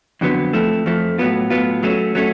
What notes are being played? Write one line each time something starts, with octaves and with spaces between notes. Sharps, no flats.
F2 D3 F#3 B3
F2 F3 A3
F2 F3 A3
A2 F#3 B3 F4
A2 F#3 B3 F4
F#3 A3 C#4
F#3 A3 C#4